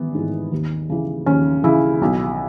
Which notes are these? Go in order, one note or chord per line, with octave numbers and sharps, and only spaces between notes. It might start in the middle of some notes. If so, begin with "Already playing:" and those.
Already playing: G#1 E3 B3
G#2 E3
D#2
C#3 E3
D#2 C#4
C#3 E3 E4
B1